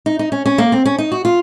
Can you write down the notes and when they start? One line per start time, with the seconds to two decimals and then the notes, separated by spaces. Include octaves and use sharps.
0.06 D#4
0.19 D#4
0.32 C#4
0.46 C#4
0.58 A#3
0.72 C4
0.85 C#4
0.98 D#4
1.12 F#4
1.25 F4